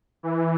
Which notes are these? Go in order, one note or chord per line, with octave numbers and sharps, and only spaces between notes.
E3